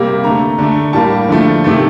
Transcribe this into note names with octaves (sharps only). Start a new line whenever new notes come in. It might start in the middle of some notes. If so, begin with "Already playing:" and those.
Already playing: C3 G3 A#3
D3 A3 A#5
D3 A3
A2 G3 A#3 A5
D3 F3 A3
C3 D#3 A3